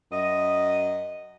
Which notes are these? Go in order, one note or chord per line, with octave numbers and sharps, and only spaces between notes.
F#2 D#5